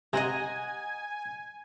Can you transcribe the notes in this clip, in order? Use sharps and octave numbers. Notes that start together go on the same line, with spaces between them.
C3 C4 D#5 F#5 G#5 A#5